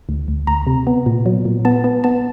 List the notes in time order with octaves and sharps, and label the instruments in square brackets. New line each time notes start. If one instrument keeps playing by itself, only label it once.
[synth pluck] D2
D2
D2 A#5
C3
B3
A#2
F#3
A#2
B3 A5
B3
B3 A5